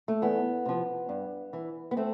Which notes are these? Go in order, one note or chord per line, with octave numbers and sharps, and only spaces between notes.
A3
E2 B3
C3 F3
G2
E3
B3
A3 C4